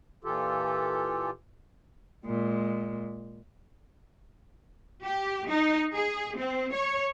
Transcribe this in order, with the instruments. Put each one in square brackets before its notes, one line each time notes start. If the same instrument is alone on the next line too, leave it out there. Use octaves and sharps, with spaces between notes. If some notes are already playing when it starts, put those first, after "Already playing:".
[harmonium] A#2 E3 F4 G4 A4
[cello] A#2 G#3
[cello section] G4
D#4
G#4
C4
C#5